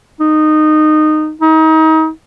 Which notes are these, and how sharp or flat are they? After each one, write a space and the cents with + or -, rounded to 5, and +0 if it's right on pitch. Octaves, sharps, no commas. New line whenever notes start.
D#4 -15
D#4 +30